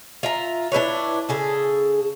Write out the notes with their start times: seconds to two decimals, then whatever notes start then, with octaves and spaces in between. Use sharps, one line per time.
0.23 F4 E5 A#5
0.72 D4 E4 B4 C#5
1.29 C#3 G#4 A4